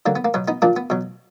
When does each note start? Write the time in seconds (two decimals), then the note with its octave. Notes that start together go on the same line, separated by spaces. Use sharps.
0.06 D3 F#3 A#3
0.16 B3
0.25 A#3
0.34 B2 F#3 B3
0.48 B3 D#4
0.62 A#2 F3 A#3 D4
0.76 B3
0.90 B2 F#3